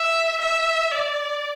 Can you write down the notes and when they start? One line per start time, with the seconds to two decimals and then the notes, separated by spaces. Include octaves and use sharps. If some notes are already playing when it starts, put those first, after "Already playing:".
Already playing: E5
0.41 E5
0.92 D5